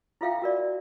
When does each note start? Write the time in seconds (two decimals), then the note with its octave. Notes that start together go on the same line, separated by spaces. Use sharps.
0.21 E4 F4 A4 E5 F5 G5
0.42 F#4 A#4 D5